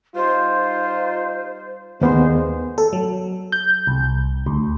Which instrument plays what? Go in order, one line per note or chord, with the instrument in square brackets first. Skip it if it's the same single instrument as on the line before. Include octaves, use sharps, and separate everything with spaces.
[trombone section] G3 D#4 F4 [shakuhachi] C5
[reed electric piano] D#2 B3 [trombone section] A#2 G#3 [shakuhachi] C5
[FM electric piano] A4
F#3
G6
C2
D2